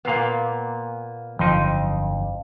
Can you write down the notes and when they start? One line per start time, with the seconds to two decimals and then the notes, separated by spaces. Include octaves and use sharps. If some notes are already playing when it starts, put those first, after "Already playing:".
0.05 A#2 A#3 B3 F5
1.39 G1 F2 D3 F3 F#3 D#4 C6